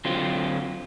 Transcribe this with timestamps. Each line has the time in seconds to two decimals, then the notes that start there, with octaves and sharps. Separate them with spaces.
0.05 D3 F#3 C4 F4